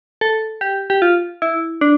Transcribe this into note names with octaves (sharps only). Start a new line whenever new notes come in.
A4
G4
G4
F4
E4
D4